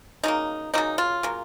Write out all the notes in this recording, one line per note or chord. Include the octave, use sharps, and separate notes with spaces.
C#3 F#3 A#3 D#4
C#3 F#3 A#3 D#4
F4
C#3 F#3 A#3